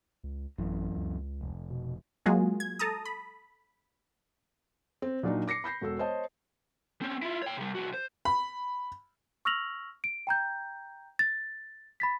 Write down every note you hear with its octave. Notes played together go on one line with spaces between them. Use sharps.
C#2
A1 F#2 E3
C#2
F1
B2
F#3 G#3 A#3 F4 F#4 G#4
G#6
A4 A5 A#5 D#6
B5
C4
A#2 F#3 D4 D#4
D6 A#6 C7 C#7
B5 G6 A#6 C7
E1 F#4 A4 E6
C5 C#5 D#5 A5
C4 C#4
E4 F4
C#5 G5
C3 G3
C2 F#4
C5
B5
C#6 E6 F6 A#6 F7 F#7
D7
G5 A#5 G6
A6
B5 A6 B6